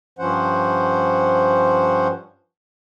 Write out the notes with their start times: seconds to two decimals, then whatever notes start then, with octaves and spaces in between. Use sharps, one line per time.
0.19 G2 F3 C#4 C5 F#5